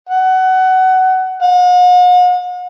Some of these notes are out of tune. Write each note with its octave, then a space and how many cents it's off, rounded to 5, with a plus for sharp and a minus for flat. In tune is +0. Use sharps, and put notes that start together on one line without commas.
F#5 +20
F#5 -45